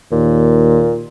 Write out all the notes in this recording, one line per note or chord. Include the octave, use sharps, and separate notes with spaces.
D#2 A#2